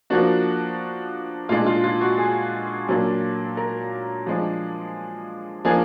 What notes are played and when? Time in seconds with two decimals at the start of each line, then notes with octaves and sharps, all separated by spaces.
0.10 F3 A#3 D4 F#4
1.49 A#2 G#3 D4 F4
1.66 F4
1.84 F4
2.01 F#4
2.18 G#4
2.88 A#2 F#3 A#3 D4
3.57 A#4
4.27 F3 G#3 D4
5.65 F3 A#3 D4 G#4